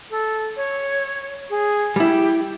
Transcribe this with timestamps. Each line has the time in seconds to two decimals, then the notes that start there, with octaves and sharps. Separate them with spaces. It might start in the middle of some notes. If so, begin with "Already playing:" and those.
0.10 A4
0.56 C#5
1.50 G#4
1.96 G3 E4 G4